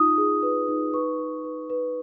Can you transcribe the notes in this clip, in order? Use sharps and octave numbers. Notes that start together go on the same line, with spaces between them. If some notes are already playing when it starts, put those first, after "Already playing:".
Already playing: D#4 F4 D#6
G#4
B4
D#4
B4 C#6
B4
B4
B4